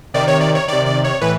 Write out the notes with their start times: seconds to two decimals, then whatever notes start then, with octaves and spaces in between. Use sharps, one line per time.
0.14 C3 D#3 D5
0.28 C#5
0.41 D5
0.55 C#5
0.68 C3 D#3 D5
0.86 D5
1.04 C#5
1.21 A2 E3 B4